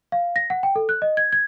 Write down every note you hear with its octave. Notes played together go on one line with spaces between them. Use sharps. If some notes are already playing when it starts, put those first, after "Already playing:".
F5
A#6
F#5
G5
A4
F#6
D#5
G#6
G#6